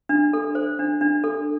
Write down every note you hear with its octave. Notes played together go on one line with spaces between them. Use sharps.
D4
A4
C5
D4
D4
A4